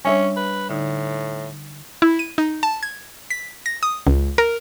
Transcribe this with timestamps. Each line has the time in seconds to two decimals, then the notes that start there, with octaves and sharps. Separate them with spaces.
0.05 G3 C#4 D4 C#5 E5 G#5
0.36 B4
0.69 A2 D3 D#4
2.02 E4
2.19 D#7
2.38 D#4
2.63 A5
2.83 G#6
3.31 B6
3.66 A#6
3.83 D#6
4.07 C#2
4.38 A#4